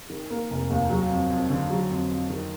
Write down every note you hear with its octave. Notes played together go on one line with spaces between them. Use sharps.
D#3
A#3
F1
D#2
F#3
F2
F2
D3
F#3
F2
F2
D#3